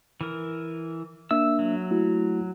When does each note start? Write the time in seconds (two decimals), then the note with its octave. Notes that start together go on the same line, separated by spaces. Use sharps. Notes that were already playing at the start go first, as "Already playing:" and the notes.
0.21 E3 A#4
1.31 A#3 D4 E5 E6
1.59 F#3
1.91 A3 E4 F#4